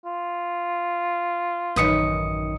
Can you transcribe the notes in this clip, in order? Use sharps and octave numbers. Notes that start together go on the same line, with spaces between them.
F4
A1 F#2 D#3 B4 D#6 C#7